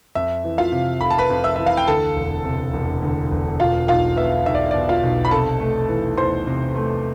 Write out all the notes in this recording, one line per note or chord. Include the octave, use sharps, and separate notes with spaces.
F2 E5
E3
F4 F5
C3
F1 B5
A5
B4 B5
F2
E5 E6
E3 E5
F5
G5
D2 A4 A5
E1
C3
E1
D2
E1
B2 F4 F5
B1 F4 F5
B3 E5
B1 E5
D5
B2 D5
F4 F5
B1
B5
C3 A4 A5
A3
E3
E2 C5 C6
C3
A3